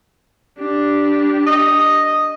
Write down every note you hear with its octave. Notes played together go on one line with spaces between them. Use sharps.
D4 G4
D#5